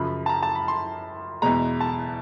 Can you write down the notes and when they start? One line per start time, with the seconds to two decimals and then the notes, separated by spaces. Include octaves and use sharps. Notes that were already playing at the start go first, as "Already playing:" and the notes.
Already playing: F#2 C#3 F3 B5
0.26 A5
0.29 A#5
0.43 A5
0.55 B5
0.68 C6
1.42 E2 B2 G#3 A#5
1.81 A5